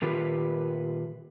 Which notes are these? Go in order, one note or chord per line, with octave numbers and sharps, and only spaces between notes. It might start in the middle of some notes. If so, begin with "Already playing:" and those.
A#2 D#3 F4 G4 B4